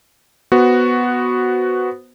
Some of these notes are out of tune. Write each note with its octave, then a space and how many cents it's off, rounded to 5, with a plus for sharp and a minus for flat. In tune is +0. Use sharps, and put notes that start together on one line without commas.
B3 +0 F#4 +0 C5 +0